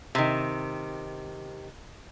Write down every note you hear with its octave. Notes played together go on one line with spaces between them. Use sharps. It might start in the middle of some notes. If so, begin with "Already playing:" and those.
C3 D#3